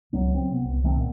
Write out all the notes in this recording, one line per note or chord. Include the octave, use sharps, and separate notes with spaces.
C#2 F#3 B3
F#3 C4
C3 B3
C2
C2 D#3 A3 C4
A#2 B3